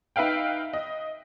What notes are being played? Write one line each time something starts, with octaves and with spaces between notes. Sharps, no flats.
D#4 B4 E5 F5 G5
D#5